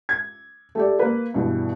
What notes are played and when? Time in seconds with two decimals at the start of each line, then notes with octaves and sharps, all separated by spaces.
0.09 G#6
0.75 A3 G4 D5
0.99 A#3 B4
1.34 G2 B2 E3